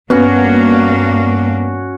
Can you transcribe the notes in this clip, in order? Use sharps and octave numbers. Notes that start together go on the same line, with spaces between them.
G2 A#3 B3 C#4 D4 F#4